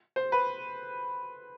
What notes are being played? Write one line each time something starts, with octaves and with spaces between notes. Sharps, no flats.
C5
B4